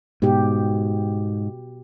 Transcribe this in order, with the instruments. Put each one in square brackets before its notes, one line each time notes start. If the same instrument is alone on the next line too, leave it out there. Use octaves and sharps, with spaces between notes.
[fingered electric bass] G#2 [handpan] B2 G4